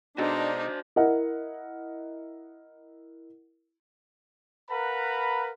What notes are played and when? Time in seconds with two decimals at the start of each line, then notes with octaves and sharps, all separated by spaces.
0.18 B2 G#3 D4 D#4 F#4 A4 C5
0.96 E4 A#4 D#5 F#5
4.70 A#4 B4 F5 F#5 A#5 B5